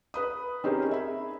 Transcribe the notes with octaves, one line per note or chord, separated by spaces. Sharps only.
B4 B5 D#6
C4 C#4 D#4 G4 G#4 A#4
G#4 E5 B5